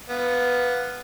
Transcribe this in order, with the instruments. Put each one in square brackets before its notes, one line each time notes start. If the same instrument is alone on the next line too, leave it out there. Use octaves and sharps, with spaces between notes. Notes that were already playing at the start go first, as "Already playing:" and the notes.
[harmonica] B3 F5